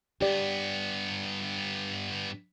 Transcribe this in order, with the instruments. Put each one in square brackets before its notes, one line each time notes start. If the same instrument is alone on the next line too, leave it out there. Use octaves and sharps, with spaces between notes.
[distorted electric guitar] G2 B3 [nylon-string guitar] G4 D5